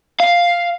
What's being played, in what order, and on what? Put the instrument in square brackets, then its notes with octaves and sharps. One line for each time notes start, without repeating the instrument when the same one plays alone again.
[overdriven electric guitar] F5